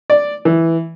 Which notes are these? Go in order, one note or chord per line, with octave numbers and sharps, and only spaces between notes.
D5
E3